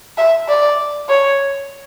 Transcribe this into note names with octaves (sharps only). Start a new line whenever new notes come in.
E5
D5
C#5